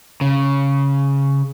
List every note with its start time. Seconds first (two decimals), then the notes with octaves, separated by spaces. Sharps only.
0.21 C#3